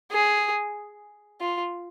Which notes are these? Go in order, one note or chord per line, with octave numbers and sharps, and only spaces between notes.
G#4
F4